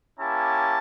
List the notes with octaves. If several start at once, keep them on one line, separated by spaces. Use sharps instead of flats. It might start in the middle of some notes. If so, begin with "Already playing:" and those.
A#3 C#4 E4 G4 A5